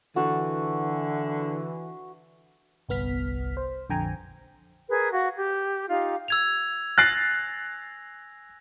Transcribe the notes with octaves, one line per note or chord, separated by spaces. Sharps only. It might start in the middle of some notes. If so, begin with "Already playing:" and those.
D3 E3 F#4
G1 C2 B3 F6 B6
C5
A#1 F2 D3 G5 G#5 A#5
G#4 A#4 B4
F#4 F5
G4
D#4 F4 G4 F5
E6 G#6 F7
G#5 F#6 A6 A#6 C7